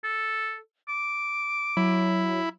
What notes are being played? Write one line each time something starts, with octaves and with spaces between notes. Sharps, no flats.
A4
D6
F#3 E4